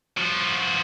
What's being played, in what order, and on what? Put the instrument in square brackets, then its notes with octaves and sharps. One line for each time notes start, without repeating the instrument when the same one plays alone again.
[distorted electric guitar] F3 F#4